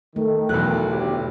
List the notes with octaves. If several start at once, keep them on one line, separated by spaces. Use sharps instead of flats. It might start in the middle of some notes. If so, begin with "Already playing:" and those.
D#3 A3
B1 E2 B2 E3 F#6
G1 D2 G4